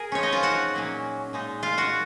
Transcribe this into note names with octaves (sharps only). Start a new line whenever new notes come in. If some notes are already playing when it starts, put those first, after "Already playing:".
Already playing: G#4 A#4 G#5
F3 C4 C#4 D#4 C#5
D#4 D#5
F4 F5
F#4 F#5
A#2 F#3 A#3 C#4
A#2 G#3 D#4
F4 F5
F#4 F#5